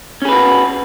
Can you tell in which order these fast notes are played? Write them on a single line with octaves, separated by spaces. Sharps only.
C#4 G#4 B4 F#4